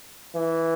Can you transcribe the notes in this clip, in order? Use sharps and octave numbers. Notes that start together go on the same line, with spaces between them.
E3